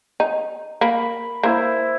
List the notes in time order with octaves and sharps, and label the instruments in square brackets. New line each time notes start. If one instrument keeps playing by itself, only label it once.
[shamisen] D#4
[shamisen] A#3 [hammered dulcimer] B5
[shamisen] A#3 [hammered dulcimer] E4 C5